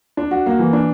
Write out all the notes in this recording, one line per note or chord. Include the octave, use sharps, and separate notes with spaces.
D4
F#4
A#3
E3
D4